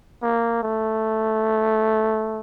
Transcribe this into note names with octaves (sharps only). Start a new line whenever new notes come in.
A#3
A3